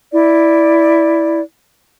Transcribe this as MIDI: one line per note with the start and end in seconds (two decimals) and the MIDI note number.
0.13 1.41 64
0.13 1.41 74